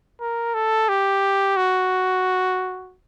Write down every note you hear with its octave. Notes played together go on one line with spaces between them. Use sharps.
A#4
A4
G4
F#4